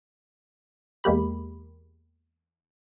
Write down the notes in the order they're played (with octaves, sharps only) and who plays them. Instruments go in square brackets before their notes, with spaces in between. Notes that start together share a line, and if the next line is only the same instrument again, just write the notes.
[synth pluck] E2 G#3 A#3 G4 B5